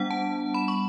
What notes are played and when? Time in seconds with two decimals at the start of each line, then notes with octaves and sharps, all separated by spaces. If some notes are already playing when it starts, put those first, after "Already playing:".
Already playing: G3 B3 D4 F#5
0.11 A5
0.54 B5
0.68 C#6